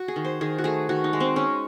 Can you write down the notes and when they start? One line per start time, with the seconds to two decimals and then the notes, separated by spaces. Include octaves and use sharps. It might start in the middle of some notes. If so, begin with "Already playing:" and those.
Already playing: F#4
0.08 G#4
0.16 D#3
0.25 C5
0.41 D#3 G#4
0.58 F#4
0.64 A3 G#4
0.89 D#3 F#4
1.04 D#4
1.13 G#3
1.20 C4
1.36 G#3 C#4